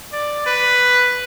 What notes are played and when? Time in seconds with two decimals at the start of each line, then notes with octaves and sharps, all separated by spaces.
0.13 D5
0.46 B4